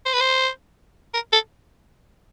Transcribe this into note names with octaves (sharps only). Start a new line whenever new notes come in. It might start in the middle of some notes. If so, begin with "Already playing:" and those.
C5
B4
C5
A#4
A4